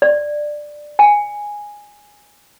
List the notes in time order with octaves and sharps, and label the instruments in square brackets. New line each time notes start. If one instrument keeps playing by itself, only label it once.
[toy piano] D5
G#5